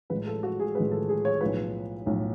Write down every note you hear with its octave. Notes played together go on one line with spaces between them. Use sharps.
A1 A2 F3 G#3 B4
A4
F#4
G#4
A1 A2 F3 G#3 B4
A4
G#4
C#5
B1 A2 F3 B4
B1 A2 F3